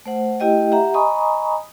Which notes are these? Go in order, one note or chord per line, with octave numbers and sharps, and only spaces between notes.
A3 C5 F#5
A3 E4 G4 D#5 G5
G4 E5 F#5 A#5
D#5 G#5 A#5 B5 C#6 D#6